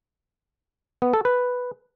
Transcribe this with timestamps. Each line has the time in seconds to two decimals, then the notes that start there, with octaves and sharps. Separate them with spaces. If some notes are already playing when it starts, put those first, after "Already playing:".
1.02 B3
1.13 A4
1.25 B4